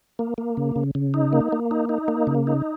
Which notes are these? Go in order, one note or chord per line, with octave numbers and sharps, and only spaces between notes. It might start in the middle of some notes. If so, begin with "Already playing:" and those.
A#3
A#3
C#3
C#3
C#3
D#4
A#3
A#3
D#4
D#4
A#3
C#3
D#4